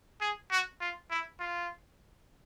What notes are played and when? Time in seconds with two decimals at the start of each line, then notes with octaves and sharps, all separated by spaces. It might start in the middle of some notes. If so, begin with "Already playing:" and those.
0.21 G#4
0.51 F#4
0.81 F4
1.11 E4
1.40 F4